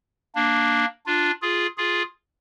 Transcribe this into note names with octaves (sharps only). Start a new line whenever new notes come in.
A#3 D4
D4 F4
F4 G#4
F4 G#4